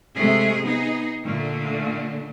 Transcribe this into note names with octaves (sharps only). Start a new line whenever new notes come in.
C3 G#3 A3 G#4
B3 D#4 G#4
A#2 D3 A3